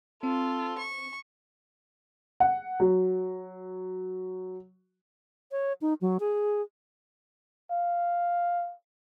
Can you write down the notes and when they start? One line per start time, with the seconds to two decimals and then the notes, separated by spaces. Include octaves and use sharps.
0.23 C4 F4 A4
0.78 C#6
2.40 F#5
2.80 F#3
5.51 C#5
5.81 D#4
6.01 F#3
6.20 G#4
7.71 F5